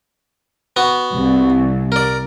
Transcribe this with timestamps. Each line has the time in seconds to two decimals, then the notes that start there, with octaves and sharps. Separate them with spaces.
0.76 B3 F#4
1.15 C2
1.92 A#4 D5